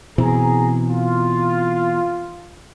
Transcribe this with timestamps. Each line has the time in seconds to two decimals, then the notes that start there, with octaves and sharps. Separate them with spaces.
0.18 B2 E3 C4 G#4 A#5
0.90 F4